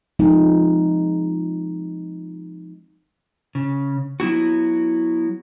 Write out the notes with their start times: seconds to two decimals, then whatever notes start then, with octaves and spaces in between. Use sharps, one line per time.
0.19 F3 G#3 C4 D#4
3.55 C#3
4.20 F#3 B3 E4 F#4